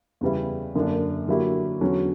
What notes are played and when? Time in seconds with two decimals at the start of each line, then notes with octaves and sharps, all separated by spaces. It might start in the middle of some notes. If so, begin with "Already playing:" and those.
0.21 E2 C#3 G3 B3 E4
0.75 F#2 D3 A#3 D4
1.28 D3 F#3 A#3 E4 G4
1.81 E2 D3 F#3 C#4